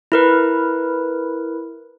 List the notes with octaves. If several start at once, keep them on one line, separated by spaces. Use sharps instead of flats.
E4 A#4 B4